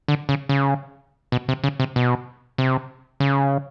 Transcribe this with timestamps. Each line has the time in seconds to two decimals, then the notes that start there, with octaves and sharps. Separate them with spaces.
0.08 D3
0.29 C#3
0.49 C#3
1.32 B2
1.48 C3
1.64 C#3
1.80 C3
1.96 B2
2.58 C3
3.20 C#3